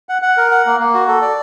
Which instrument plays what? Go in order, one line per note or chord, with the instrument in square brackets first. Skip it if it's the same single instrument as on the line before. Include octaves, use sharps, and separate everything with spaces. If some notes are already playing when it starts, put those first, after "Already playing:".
[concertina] F#5
F#5
A#4
F#5
A#3
A#3
F#4
A4
D5